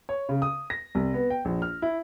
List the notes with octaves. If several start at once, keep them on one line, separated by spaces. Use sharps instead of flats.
C#5
C#3
D#6
A#6
C2
B3
G5
A#1
F6
E4